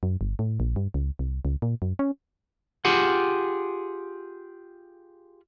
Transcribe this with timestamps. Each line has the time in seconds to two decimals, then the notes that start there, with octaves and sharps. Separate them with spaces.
0.03 F#2
0.21 G1
0.39 A2
0.60 A#1
0.76 G2
0.94 C#2
1.19 C2
1.45 C#2
1.62 A#2
1.82 F#2
1.99 C#4
2.85 F4 G4 G#4 F#5